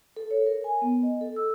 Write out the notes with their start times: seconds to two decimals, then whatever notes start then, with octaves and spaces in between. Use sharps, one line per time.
0.17 A4
0.31 C#5
0.46 A#4
0.64 G#5
0.82 B3
1.03 D#5
1.21 A4
1.36 E6